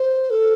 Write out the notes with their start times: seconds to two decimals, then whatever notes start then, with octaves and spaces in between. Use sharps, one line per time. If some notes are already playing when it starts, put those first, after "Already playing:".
Already playing: C5
0.30 A4